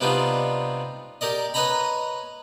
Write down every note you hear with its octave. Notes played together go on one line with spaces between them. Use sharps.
C3 G3 B3 D4 D#4 F4
G4 A#4 D5 D#5
B4 C#5 D#5 G#5 A#5 B5